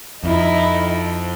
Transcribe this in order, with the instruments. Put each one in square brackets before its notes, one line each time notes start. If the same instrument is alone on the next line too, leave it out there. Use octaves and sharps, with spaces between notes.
[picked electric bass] F2 [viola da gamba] D#4 E4